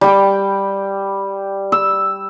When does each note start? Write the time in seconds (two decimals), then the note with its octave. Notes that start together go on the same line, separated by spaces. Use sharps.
0.01 G3 G5 D6
1.72 E6